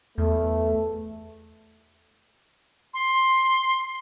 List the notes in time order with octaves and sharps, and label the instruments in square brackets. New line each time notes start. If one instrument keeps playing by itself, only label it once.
[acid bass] E2 [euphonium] A3
[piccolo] C6